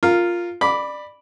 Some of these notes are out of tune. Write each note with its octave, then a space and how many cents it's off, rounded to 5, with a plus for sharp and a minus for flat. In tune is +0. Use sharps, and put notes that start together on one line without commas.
F4 +0 A#4 -15
D5 +20 B5 -5 D6 -10